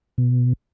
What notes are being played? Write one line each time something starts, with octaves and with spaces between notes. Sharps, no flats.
B2